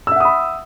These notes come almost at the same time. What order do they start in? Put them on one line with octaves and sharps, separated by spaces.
E6 E5 F#5 D#6 B5